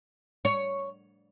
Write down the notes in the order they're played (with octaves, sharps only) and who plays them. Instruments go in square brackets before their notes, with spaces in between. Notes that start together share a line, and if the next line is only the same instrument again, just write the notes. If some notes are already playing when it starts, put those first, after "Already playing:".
[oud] C#5